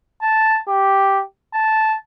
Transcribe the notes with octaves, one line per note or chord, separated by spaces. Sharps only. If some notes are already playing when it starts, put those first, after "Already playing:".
A5
G4
A5